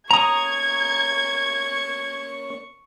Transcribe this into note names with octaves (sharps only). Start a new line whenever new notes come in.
A#3 C#4 C#5 A#5 C#6 D#6 G#6